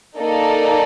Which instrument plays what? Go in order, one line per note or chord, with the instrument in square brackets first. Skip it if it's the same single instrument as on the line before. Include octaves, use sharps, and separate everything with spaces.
[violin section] A#3 D#4 A4 D5